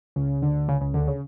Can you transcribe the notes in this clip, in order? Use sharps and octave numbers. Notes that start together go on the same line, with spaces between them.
C#2 C#3
D2 D3
C#2 C#3
C#2 C#3
D2 D3
C#3